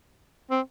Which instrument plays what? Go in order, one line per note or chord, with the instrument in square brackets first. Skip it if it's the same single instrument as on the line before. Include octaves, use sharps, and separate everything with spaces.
[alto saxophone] C4